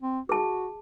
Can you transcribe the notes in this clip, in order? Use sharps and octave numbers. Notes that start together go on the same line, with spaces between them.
C4
F#4 G#4 A5